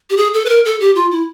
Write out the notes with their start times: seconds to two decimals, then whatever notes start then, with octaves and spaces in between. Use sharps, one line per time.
0.10 G4
0.17 G#4
0.34 A4
0.45 B4
0.49 A#4
0.65 A4
0.80 G4
0.95 F4
1.11 E4